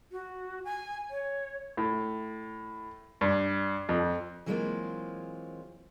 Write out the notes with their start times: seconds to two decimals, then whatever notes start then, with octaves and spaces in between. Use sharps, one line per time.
0.12 F#4
0.65 G#5
1.11 C#5
1.77 A2
3.21 G2
3.89 F2
4.46 E3 F#3 G#3 A#3 C4 F4